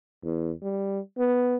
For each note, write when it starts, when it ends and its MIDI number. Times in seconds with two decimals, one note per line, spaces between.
0.24 0.52 40
0.63 1.00 55
1.18 1.57 59